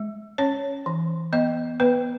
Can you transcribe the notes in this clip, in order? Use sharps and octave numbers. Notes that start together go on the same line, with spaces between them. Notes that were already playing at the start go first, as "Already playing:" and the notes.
Already playing: G#3
C#4 C#5
E3
B3 D#5
B3 B4